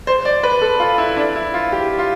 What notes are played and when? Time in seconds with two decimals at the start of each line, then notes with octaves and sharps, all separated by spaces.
0.07 C5
0.25 D5
0.43 B4
0.62 A4
0.80 F4
0.98 E4
1.17 D4
1.36 E4
1.54 F4
1.72 G4
1.99 F4